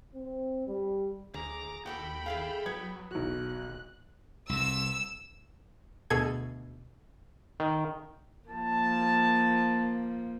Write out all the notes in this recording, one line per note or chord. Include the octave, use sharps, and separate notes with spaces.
C4
G3
D2 G#4 A#5 D6
D#2 F#4 G4 A4 G5 B5
A3 G#4 A4 F5
F#3 B3 G#6
D#1 B1 F#4 F#6
C2 C3 E6
D2 B2 G#4 A4 G#6
D#3
F3 A#3 A5